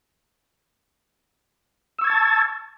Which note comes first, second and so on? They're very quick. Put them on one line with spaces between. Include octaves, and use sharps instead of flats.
E6 C#6 G#6 A6 A5